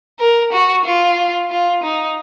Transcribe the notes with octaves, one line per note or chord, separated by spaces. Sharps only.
A#4
F#4
F4
F4
D#4